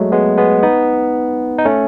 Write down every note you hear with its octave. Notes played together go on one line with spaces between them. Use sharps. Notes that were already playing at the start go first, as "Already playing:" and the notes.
Already playing: F#3 G#3 A3
G#3 B3
G#3 B3
B3 D#4
D#4
A3 C#4